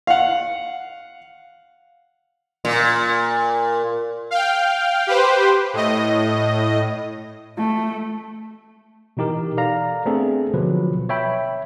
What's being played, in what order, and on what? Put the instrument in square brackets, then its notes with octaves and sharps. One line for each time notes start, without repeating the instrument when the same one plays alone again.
[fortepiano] F5 F#5
[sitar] A#2
[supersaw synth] F5 G5
G4 B4 C5
A2 D#5
[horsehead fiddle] A3
[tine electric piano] B2 E3 D#4 G4 A#4
A4 D5 F5 A#5
A3 B3 C4 D4 G#4 A4
B2 D3 F3 F#3 B4
C#5 E5 G5 B5